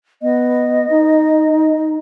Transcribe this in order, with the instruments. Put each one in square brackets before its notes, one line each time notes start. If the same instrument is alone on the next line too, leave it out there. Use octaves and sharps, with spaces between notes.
[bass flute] B3 [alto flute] D#5
[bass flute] D#4